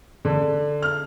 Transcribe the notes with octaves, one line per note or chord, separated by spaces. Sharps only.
D3
F6